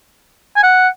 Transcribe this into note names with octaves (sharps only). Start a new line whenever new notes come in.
G#5
F#5